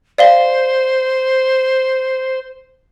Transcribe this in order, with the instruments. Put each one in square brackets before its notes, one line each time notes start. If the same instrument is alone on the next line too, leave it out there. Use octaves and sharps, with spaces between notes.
[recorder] C5 [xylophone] D5 F5 G7